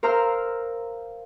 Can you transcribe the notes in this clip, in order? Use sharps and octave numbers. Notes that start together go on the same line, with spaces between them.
A#4 C5 F5 A#5 E6 F6